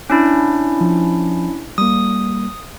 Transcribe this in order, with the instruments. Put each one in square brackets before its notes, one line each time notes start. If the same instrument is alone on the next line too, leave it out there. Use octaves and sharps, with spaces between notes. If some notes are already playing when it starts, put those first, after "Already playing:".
[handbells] C#4 D4 E4
[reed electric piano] F3
[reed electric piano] G3 A#3 [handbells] D#6